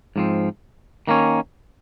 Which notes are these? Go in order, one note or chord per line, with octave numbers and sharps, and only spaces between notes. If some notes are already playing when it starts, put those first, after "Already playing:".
G#2 F3 C4
D#3 A#3 C#4